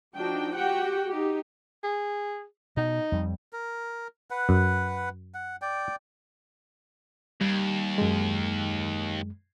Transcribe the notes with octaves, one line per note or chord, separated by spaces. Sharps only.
F3 D4 D#4 F#4 G5
F#4 G4 F#5 G5
D#4 G4
G#4
B2 D#4
F2 G3
A#4
B4 F#5
F#2
F#5
D5 G5
D#2 G3
F#2 G#3